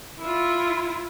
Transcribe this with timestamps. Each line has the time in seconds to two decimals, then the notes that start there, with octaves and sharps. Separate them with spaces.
0.19 E4 F4